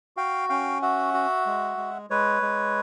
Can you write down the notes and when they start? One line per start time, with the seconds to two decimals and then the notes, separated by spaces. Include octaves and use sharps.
0.17 F#4 F5 G5
0.49 C#4 F5 G5
0.82 F#4 E5 F#5
1.14 F#4
1.46 G#3
1.77 G#3
2.10 G#3 B4 C#5
2.42 G#3